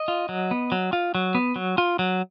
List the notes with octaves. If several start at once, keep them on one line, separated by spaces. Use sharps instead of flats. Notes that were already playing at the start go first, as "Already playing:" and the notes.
Already playing: D#5
F4
F#3
B3
F#3
F4
F#3
B3
F#3
F4
F#3